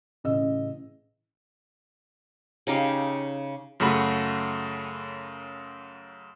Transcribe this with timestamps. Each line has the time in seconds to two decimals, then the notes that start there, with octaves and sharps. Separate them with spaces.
0.24 A1 C#3 D#5 E6
2.67 C#3 D#4 G4 F5
3.80 F#2 C#3 A3 F#4 B5